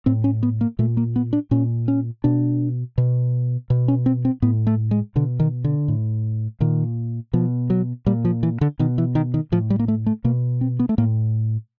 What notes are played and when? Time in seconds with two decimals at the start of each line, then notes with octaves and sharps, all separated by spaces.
0.06 A2 C4
0.24 C#4
0.43 B3
0.61 A#3
0.79 A#2 A3
0.97 A#3
1.16 B3
1.33 D4
1.51 A#2 C#4
1.88 C#4
2.24 B2 D4
2.98 B2
3.70 B2
3.88 C#4
4.06 C4
4.25 C4
4.42 A2 B3
4.67 A3
4.91 G#3
5.16 B2 D3
5.40 D#3
5.64 D3
5.88 A2
6.60 A#2 D#3
7.33 B2 F3
7.70 F#3
8.06 A#2 G3
8.25 F3
8.43 E3
8.61 D3
8.79 B2 D#3
8.98 E3
9.15 D#3
9.34 D#3
9.52 A2 F3
9.70 G3
9.79 A#3
9.88 A3
10.06 A3
10.24 B2 A#3
10.61 C4
10.79 B3
10.89 A3
10.98 A2 A#3